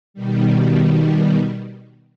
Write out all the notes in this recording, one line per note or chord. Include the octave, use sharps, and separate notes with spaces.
B2 D#3 G3